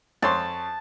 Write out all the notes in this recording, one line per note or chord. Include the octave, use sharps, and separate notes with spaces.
F2 C#5 A5 C6